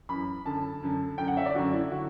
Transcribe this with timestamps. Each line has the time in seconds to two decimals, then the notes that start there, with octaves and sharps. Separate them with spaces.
0.09 F#2 E3 B5
0.45 F#2 D3 A5
0.82 F#2 D3
1.18 F#2 D3 G5
1.27 F#5
1.37 E5
1.46 D5
1.55 F#2 D3 F#4
1.73 E4
1.91 D3 F#4